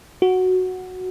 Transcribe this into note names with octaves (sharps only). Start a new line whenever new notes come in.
F#4